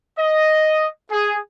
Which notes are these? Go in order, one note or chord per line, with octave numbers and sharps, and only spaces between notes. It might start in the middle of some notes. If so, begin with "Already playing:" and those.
D#5
G#4